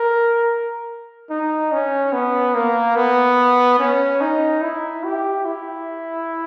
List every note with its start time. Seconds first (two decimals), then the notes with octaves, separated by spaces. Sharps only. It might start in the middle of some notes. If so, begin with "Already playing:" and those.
Already playing: A#4
1.30 D#4
1.72 C#4
2.13 B3
2.55 A#3
2.96 B3
3.79 C#4
4.21 D#4
4.62 E4
5.04 G4
5.46 E4